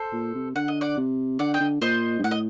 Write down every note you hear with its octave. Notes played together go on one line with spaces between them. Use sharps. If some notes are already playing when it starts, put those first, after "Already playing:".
Already playing: A4 C5
A#2
C3
D3 F#5
D#5
D5 F#5
C3
D3 D5 F#5
D#5 G5
D3
A#2 C5 D#5
G2
A2 F#5
D#5